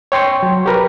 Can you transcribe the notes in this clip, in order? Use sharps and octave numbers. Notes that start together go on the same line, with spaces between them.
C#5 G5 C6 C#6
F#3
G4 A#4 B4